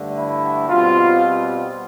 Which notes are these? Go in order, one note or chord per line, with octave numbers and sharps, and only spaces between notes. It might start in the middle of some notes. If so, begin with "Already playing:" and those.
Already playing: G2 D3 A3
E4
B2 G3 C4 F4